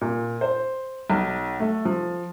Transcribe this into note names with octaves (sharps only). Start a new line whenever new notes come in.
A#2
C5
B1
A3
F3